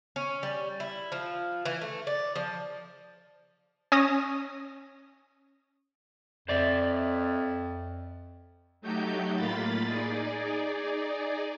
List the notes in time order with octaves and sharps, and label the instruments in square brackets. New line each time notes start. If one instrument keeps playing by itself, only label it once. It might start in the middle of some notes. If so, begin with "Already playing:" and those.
[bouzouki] C#4
G3
E4
F3
E3
A3
D5
F3
[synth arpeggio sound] C#4 D#6 A#6
[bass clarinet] F2 [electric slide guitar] C5 D5 E5
[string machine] F#3 A3 D#4 F#4 G4 G6
A2 A#3 F4 B5 A6
D#4 G#4 D5